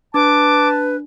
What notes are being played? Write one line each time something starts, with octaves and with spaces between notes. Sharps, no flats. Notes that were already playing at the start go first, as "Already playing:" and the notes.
D4 B4 A5 D6